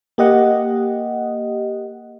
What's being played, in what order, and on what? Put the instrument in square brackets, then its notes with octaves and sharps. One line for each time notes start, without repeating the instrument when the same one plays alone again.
[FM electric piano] A#3 G4 D#5 F#5